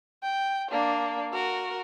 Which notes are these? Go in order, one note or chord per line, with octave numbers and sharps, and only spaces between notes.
G5
A#3 D4
F#4 A#4